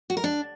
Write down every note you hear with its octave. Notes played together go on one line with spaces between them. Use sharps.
F#4
A#4
D4